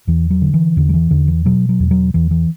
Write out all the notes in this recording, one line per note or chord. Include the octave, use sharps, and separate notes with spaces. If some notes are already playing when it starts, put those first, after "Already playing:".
E2 E3
F#3
D3
E3
E2 D3
F#3
E3
E2 D3
E3
B2 F#3
F#3
E2
F#3
E2 E3
E3